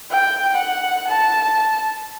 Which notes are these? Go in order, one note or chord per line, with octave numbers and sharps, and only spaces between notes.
G5
F#5
A5